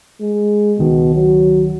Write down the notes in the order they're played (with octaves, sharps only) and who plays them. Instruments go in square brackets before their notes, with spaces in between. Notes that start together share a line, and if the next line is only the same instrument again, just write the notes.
[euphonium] G#3
[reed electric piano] C#2 D#3 [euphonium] B2
[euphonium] F#3